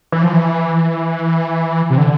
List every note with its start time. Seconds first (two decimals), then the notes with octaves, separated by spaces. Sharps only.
0.12 E3
0.23 F3
0.33 E3
1.90 C3
1.98 D3